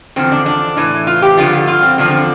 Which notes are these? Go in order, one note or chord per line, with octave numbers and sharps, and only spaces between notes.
E2 D3 F3 C4
D4
D4
A2 E3
F4
G4
G2 D3 F3 F4
F4
C4
E2 D3 F3 D4
C4
D4